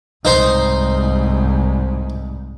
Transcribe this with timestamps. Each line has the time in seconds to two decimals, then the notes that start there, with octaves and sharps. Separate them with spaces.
0.25 C2 G#2 D#4 C5 C6